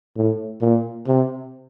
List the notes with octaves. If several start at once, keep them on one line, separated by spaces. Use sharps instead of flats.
A2
A#2
C3